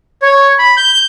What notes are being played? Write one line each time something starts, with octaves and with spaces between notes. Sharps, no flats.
C#5
B5
G6